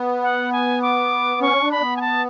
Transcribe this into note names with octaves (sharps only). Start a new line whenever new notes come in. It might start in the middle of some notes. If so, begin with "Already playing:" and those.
Already playing: B3
F#5
G#5
D6
C#4 C#6
D4
B5
B3
G#5
A5